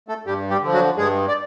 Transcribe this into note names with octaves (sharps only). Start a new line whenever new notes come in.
A3 A4
G2 G3 G4
G3 G4
D3 F3
F#3 F#4
G2 G#3 G#4
D5